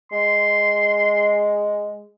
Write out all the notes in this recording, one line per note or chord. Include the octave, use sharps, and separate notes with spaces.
G#3 C6